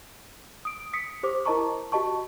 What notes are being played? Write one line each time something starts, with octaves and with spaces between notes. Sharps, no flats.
D#6 D7
D#6 B6 C#7
G4 C5 D6
E4 A#4 D#5 A5 A#5 C#6
F#4 G4 D#5 A5 C#6